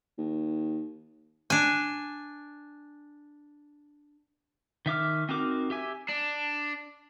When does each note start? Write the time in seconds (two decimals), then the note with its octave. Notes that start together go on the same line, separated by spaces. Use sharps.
0.18 D#2
1.50 D4 G#5
4.86 D#3 E5 D6 F6
5.29 C4 D#4 F#4 A#4 D6
5.70 G4 E5 G#5
6.09 D4